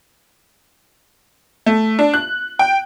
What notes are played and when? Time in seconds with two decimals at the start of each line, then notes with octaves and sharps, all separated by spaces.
1.66 A3
1.99 D4
2.14 F#6
2.59 G5